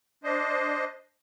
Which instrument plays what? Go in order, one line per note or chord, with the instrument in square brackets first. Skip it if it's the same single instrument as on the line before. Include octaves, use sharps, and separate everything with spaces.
[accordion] D4 C5 D#5